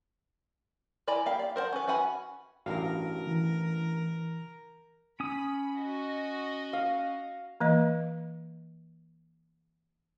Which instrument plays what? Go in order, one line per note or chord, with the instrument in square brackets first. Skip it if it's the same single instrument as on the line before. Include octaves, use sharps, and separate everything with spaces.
[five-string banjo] E4 D5 G#5 A#5 B5
A#3 G4 F5
D5
A#4 C5 D5 F#5 A5
C#4 B4
C#4 F#4 F#5 G#5 B5
[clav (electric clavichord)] A1 G2 F5 [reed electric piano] F#4 [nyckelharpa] A#4
[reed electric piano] E3
[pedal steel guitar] C#4 D#6 [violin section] B5
[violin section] F#4 D#5
[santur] F5
[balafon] E3 A#3 D#5